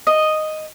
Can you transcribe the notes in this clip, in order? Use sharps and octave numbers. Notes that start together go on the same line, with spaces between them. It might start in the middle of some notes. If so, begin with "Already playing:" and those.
D#5